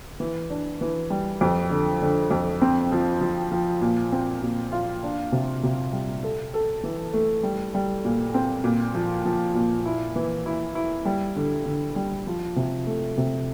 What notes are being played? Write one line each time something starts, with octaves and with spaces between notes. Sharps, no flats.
E3
D4
E3
G3
F2
D3
D3
F2
C4
F3
F3
F3
A#2
C4
A#2
F4
D4
C3
C3
G3
A4
A4
E3
A3
G3
G3
A#2
C4
A#2
F3
F3
A#2
E4
E3
E4
E4
G3
D3
D3
G3
F3
C3
A3
C3